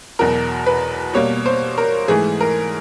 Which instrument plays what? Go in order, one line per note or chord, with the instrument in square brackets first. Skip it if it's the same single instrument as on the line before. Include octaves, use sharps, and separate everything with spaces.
[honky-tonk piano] E2 B2 F#3 A#4
B4
B2 G3 A#3 C#5
C5
A#4
G#2 E3 A3 G#4
A#4